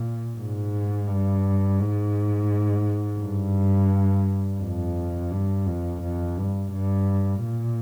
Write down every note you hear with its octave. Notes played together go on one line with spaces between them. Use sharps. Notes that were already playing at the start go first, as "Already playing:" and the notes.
Already playing: A#2
G#2
G2
G#2
G2
F2
G2
F2
F2
G2
G2
A#2